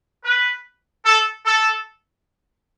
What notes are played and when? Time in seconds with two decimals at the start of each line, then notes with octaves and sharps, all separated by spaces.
0.25 B4
1.05 A4
1.46 A4